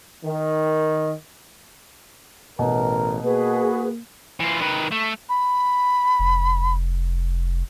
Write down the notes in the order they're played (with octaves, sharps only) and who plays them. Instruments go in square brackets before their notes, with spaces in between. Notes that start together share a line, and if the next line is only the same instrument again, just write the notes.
[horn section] D#3
[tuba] A1 [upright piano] B2 [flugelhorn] A#4
[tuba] A#3 [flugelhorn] F#4 [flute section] G#4 B4
[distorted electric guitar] E3 F4
D#3 B4
A3
[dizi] B5
[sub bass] F1